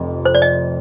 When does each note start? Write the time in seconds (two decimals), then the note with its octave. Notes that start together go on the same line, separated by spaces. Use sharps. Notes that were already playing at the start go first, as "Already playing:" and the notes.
Already playing: F1 F2 C3
0.25 C5
0.35 D5
0.42 D#5